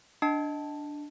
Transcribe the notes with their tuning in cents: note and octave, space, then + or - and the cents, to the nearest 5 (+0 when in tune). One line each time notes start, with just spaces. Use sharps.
D4 +0 D#5 +10 A5 +0